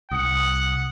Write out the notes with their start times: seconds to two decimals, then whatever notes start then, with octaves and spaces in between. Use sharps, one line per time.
0.11 C2 F#5 D#6